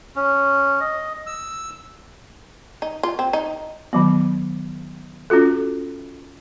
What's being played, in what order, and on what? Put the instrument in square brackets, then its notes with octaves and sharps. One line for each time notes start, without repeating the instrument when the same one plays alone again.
[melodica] C#4
D#5
E6
[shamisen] D#4
F4
C4
D#4
[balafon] D#3 F#3 B3
C#4 F4 F#4 A4